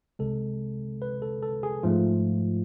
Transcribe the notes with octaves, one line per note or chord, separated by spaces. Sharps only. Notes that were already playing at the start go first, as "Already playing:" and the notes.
C2 C3 G#3 A4
B4
A4
A4
G#4
G#2 F3 A3 F4